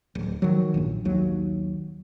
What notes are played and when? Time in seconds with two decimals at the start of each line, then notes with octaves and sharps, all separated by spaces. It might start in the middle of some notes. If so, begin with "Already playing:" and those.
0.15 D1
0.42 D#3 F3 F#3
0.74 A#1 G2 A#2
1.05 A#1 D#2 F#3